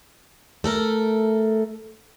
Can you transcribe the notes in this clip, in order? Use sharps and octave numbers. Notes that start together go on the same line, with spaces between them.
A3 A4 A#4